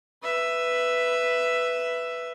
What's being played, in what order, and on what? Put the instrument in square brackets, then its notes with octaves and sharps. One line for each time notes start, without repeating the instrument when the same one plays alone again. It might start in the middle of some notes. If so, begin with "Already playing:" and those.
[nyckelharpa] B4 E5